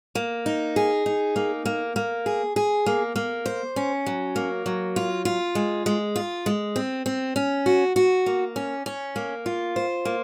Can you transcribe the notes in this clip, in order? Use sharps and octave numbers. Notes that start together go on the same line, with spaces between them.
A#3
D#4
G#4
D#4
A#3
A#3
A#3
G#4
G#4
A#3
A#3
C5
C#4
F#3
A#3
F#3
F4
F4
G#3
G#3
F4
G#3
C4
C4
C#4
F#4
F#4
A#3
C#4
C#4
A#3
F4
C5
A#3